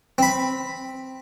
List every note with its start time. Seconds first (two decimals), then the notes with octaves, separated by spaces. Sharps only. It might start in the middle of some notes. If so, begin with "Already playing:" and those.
0.18 C4 B5